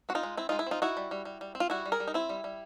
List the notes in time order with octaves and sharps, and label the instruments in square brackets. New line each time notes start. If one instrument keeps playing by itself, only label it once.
[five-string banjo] C4 F#4
D#4 F4
G#3
C4 E4
G#3 D#4 F4
E4
C4 D#4 F4
D#4 E4 F#4
G3
G3
G3
G3
C4
F4
G3 E4 F#4
G3
G#4 A#4
G3
D#4
C4 E4
G3
G3